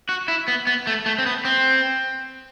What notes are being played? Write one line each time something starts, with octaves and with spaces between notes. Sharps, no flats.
F#4
E4
B3
B3
A3
A3
C4
B3
C4